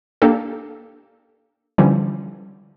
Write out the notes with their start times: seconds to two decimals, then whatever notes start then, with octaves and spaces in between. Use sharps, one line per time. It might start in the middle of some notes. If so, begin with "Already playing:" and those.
0.22 A#3 D4 G4 A4
1.78 D3 E3 F3 G3 C#4